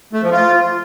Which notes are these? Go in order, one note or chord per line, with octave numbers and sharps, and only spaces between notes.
A3
F3
F4